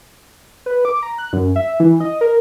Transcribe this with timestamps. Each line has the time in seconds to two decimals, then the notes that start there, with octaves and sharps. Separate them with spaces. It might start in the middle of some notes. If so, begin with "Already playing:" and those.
0.66 B4
0.85 D6
1.03 A#5
1.18 F#6
1.33 F#2
1.56 E5
1.80 E3
2.00 D#5
2.21 A#4